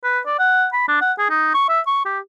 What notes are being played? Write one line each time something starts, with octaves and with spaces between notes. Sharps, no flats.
B4
D5
F#5
B5
D4
F#5
G#4
D#4
C#6
E5
C#6
G4